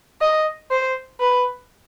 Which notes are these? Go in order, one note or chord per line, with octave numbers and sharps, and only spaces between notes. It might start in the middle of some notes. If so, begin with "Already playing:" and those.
D#5
C5
B4